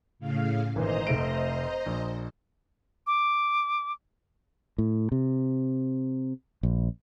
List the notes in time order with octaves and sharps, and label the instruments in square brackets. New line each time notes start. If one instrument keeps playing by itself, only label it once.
[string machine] A2 C#3 F5
[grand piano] G#1 A#2 E3 [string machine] C5 D#5 A#5
[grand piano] F1 A3 D7
A#1
[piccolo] D6
[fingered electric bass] A2
C3
A#1